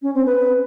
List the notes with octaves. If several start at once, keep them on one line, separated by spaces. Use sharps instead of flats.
C#4
C4
B4